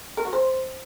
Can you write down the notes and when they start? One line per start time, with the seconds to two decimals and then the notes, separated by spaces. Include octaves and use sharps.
0.17 A#4
0.25 F#4
0.33 C5